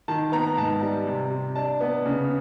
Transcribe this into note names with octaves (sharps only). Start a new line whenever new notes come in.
D#3 A5
B3 A#5
G#2 A5
G3
C3
C3
D4 A5
B3
C#3